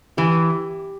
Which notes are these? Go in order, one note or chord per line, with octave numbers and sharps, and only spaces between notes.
E3 G4